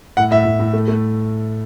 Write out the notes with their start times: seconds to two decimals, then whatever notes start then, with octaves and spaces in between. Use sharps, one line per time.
0.17 A2 F#5
0.31 A2 E5
0.45 A2
0.60 A2
0.73 A3
0.88 A3